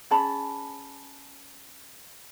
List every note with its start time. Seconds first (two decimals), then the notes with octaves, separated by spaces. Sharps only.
0.11 C#4 G#4 A5 B5